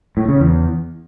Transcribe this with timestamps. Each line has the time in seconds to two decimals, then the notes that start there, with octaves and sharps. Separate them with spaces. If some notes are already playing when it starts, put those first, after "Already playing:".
0.17 A2
0.28 C#3
0.40 E2